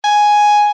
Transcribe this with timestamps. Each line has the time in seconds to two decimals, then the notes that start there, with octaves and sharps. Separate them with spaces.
0.04 G#5